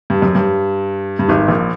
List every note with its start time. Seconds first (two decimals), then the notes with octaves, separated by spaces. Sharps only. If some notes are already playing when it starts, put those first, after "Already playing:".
0.10 G2
0.22 F#2
0.35 G2
1.19 G2
1.28 G#1 G#2
1.48 A#1 A#2